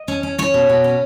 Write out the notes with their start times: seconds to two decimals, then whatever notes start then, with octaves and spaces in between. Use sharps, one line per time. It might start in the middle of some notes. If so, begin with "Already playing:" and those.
Already playing: D#5
0.08 C#4
0.23 C#4
0.38 C#4 C#5
0.54 B2
0.69 B2
0.84 C#4